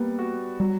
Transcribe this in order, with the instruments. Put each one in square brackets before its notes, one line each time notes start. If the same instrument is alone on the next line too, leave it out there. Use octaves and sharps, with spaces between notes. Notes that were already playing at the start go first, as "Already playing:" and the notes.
Already playing: [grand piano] G3 B3 [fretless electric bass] A#3
[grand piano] F#4
[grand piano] F#3 [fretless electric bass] G3